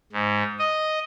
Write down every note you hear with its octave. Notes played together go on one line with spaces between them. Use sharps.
G#2
D#5